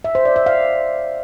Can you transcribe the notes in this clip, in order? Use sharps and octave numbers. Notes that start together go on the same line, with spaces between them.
E5
C5
D5
E5
F5